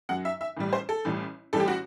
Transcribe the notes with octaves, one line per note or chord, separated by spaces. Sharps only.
F#2 F#3 F#5
E5
E5
A1 A2 G3
C5
A4
A1 A2 G3
A1 A2 G3 A4
G4
F#4